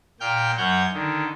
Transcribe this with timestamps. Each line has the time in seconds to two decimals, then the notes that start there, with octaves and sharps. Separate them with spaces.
0.20 A#2 G5 F6 G6
0.57 F#2 C#5 F#5 G6
0.93 D3 D#3